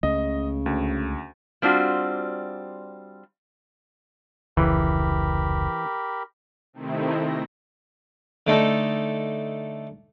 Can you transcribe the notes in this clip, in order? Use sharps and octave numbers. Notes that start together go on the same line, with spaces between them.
C#2 C#3 A3 D#5
D2
G3 C4 D4 F4 F#4
F1 C#2 E3 G4 A#4 B5
C3 D#3 A3 C4 D#4 E4
A#6
D3 A3 D#4 A4